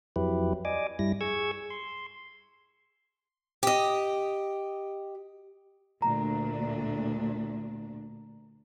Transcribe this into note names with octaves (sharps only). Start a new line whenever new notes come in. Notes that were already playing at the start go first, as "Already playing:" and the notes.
F2 F#3 E4 G4 B4
D5 D#5 G#5 D6
G2 G3 E4 A#6
G#4 C#6 E6 G#6
C6
G4 D#5
D2 A#2 D4 A#5